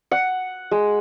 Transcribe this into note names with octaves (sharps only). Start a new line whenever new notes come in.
F#5
G#3